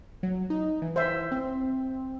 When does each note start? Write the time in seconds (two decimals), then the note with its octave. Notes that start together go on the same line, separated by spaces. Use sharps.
0.23 F#3
0.50 D#4
0.82 E3
0.96 C5 E5
1.32 C4